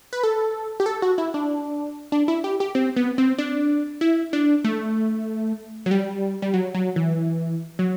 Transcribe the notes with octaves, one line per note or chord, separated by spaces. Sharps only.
B4
A4
G4
A4
F#4
E4
D4
D4
E4
G4
G4
C4
B3
C4
D4
E4
D4
A3
F#3
G3
G3
F#3
F#3
E3
F#3